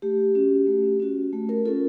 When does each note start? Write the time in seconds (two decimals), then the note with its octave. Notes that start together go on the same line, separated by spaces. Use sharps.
0.02 A3 G4
0.35 C#4 F#4
0.67 A3
1.00 C#4 F#4
1.33 A3
1.49 A#4
1.65 C#4 F4 A4